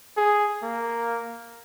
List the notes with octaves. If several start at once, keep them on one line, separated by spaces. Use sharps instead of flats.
G#4
A#3